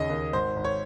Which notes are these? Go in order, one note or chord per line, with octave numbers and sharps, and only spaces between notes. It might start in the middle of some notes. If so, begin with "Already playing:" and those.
Already playing: D#2 C#3 D#5
D#2
G#1 C5
G#1
C#5